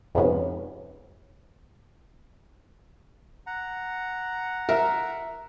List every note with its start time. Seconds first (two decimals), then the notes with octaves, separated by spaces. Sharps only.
0.15 F2 G#2 C3 B3 C#4
3.47 F#5 A#5
4.69 A#4 E5